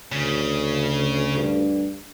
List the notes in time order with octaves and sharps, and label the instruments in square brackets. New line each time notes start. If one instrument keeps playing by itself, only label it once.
[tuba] D2 [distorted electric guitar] C#3
[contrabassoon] G2